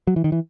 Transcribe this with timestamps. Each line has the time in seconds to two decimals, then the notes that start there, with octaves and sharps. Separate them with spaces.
0.07 F#3
0.16 E3
0.24 D#3
0.32 E3